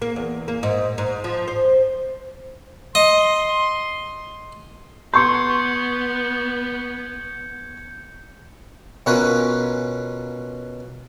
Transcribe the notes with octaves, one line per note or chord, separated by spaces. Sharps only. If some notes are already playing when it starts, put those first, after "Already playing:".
A#3
E2
A#3
G#2
G#2
F3
C5
D#5 C6
B3 C6 C#6 G6 G#6 C#7
B2 C#4 F4 A#4 B4 C#5